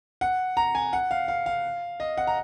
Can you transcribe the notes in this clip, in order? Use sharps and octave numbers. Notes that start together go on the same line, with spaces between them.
F#5
A#5
G#5
F#5
F5
F5
F5
D#5
F#5
A#5